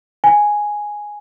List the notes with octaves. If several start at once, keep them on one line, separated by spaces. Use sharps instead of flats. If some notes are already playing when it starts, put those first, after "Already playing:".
G#5